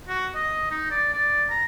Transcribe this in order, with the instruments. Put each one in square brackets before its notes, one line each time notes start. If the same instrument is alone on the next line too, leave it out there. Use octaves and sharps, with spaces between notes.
[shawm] F#4
D#5
D#4
D5
D5
A#5